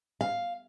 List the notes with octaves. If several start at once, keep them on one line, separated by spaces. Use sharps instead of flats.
F5